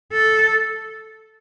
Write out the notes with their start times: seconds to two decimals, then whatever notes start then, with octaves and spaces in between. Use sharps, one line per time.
0.12 A4